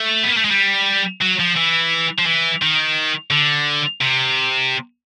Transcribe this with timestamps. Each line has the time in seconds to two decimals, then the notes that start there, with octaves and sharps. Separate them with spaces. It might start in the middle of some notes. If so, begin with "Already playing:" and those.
Already playing: A3
0.23 B3
0.30 A#3
0.37 A3
0.45 G#3
0.51 G3
1.21 F#3
1.39 F3
1.56 E3
2.19 F3
2.26 E3
2.62 D#3
3.31 D3
4.01 C3